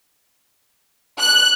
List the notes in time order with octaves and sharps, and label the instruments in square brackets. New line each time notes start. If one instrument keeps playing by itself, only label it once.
[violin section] F#6